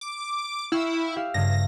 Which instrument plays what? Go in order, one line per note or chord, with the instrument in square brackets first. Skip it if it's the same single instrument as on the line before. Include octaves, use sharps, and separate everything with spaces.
[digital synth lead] D6
[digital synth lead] E4 [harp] F5 G5 C#6
[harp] G4 E5 F5
[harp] G2 C#3 [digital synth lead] A#6